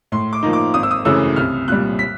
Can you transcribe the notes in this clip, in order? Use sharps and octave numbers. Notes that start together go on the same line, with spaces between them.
A2 C6
D6
F3 A#3 D#4
D6
G#1 D#6
E6
D#6
F#2 C#3 E3 A3 E6
C2 F6
A#2 G3 F#6
B6